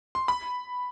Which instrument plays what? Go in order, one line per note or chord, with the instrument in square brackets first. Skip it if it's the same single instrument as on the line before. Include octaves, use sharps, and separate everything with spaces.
[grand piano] C6
B5